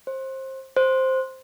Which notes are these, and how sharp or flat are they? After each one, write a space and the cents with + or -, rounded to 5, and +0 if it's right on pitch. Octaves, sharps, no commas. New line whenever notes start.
C5 +25
C5 +0